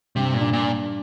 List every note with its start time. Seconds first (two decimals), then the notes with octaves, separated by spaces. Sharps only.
0.16 G2 C3
0.34 A#2
0.40 D4
0.53 A#2